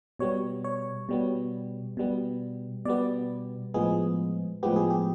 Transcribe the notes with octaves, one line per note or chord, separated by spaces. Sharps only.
B2 G3 B3 C#5
C#5
B2 G3 B3
B2 G3 B3
B2 G3 B3 D5
A2 F3 G#3 B3 G#4
A2 F3 G#3 B3 G4
G#4
G4